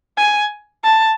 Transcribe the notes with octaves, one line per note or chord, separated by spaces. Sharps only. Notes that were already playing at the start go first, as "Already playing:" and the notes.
G#5
A5